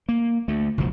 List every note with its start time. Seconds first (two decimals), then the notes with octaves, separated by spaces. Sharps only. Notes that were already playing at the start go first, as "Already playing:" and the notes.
0.09 A#3
0.48 D2 A3
0.78 F#1 C#2 B2 F3